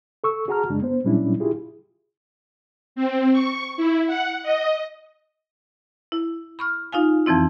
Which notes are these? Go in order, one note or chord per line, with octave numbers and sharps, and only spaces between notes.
A4 C#6 E6
F#4 G#4 F#5 A5 A#5 F6
F#2 C#3 G#3 D4
B3 C5
A#2 F#3 G3 C#4 D4 E4
E4 F4 G4 G#4
C4
C#6
E4
F#5
D#5
E4
B5 C#6 F6
D#4 F4 F5 G#5
F2 E3 F3 C4 E4